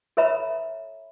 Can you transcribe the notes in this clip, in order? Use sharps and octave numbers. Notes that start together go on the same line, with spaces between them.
A4 B4 C#5 E5 A#5 B5